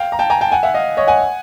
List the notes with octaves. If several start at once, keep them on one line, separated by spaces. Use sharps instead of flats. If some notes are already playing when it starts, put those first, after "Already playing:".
Already playing: F5 G5
A#5
G5 A5
G#5 A#5
G5 A5
F#5 G#5
E5 F#5
D#5 F5
C#5 D#5
F#5 G#5